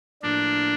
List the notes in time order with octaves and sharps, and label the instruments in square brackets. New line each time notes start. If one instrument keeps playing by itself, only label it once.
[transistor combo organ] A2 F3 A#3 [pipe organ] D4